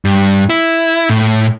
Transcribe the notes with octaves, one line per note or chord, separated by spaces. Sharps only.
G2
E4
A2